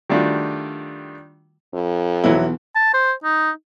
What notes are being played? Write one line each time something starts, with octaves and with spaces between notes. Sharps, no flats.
D#3 G3 A3 D4 F4 F#4
F2
B1 E2 E3 F#3 E4
A5
C5
D#4